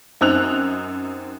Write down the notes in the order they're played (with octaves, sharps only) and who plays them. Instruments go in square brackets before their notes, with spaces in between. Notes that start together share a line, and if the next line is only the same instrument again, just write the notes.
[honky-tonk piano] F#2 C4 D#4 E6 F#6 F7